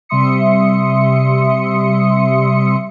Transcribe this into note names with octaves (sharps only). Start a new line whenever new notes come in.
C3 G3 E5 C6 D#6 C#7